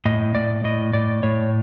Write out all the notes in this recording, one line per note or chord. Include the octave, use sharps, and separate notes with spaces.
A2 D#5
A2 D5
A2 D#5
A2 D5
A2 C#5